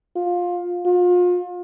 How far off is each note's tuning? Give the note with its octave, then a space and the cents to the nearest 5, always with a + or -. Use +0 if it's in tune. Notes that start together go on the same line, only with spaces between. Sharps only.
F4 +20
F4 +35